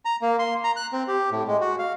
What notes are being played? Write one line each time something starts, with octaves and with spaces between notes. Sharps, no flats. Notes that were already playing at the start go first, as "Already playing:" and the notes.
A#5
A#3
C6
A#5
F#6
C4
G4
A2
G#3
F#4
F5